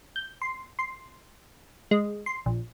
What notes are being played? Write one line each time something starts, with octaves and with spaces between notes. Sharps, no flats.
G6
C6
C6
G#3
C6
A#1